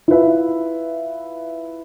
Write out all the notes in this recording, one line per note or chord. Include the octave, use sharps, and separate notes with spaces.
E4 F4 B4 E5